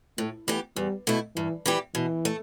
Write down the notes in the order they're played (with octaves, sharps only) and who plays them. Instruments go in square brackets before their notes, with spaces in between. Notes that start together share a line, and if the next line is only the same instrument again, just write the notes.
[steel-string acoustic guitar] A2 [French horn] A3
[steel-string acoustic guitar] E3 B3 G4 [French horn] A3
[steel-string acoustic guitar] E2 [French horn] G3
[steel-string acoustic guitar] B2 A3 E4
[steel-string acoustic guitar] G2 [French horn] E3
[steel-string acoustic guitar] E3 G3 E4 G4
[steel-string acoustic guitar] B2 [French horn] E3
[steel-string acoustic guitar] A3